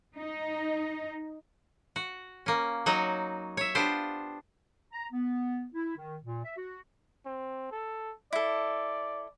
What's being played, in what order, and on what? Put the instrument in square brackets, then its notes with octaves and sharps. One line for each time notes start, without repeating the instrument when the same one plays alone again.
[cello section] D#4
[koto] F#4
A#3 C#4
F#3 D#4 F#4 C#5
C#5 E5
B3 D4 F4 G4 C5
[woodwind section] A#5
B3
E4
D#3
A#2
E5
F#4
[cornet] C4
A4
[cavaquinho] E4 A4 [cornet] D5